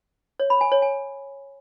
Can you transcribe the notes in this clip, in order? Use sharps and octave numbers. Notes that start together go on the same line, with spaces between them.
C#5
B5
G#5
C#5
G#5